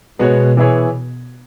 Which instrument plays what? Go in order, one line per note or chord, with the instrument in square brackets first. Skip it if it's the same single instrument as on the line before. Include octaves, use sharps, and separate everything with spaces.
[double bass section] B2 [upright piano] G#3 B3 F#4 C#5
[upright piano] E3 B3 E4 G#4 C#5